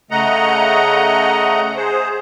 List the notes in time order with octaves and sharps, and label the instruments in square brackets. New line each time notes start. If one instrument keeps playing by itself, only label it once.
[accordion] C#3 A3 D#5 F#5 A#5
G#4 C5